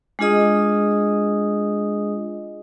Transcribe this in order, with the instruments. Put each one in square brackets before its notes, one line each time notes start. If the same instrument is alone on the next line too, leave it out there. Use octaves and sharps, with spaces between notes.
[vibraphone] G#3 D4 F4 G#4 D#5 D#6